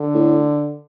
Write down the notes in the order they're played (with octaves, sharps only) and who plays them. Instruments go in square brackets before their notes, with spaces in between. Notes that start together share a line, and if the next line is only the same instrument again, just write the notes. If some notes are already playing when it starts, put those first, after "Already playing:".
Already playing: [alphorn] D3
[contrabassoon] A2